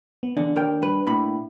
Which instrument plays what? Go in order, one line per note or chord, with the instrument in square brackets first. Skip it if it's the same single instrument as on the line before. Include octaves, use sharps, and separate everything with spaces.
[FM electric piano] B3
[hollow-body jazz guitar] E2 D3 [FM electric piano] D4
[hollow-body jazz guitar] D#2 A#4 G5
G2 B4
A2 A#3 B5